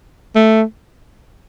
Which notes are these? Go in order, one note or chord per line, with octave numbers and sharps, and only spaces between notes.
A3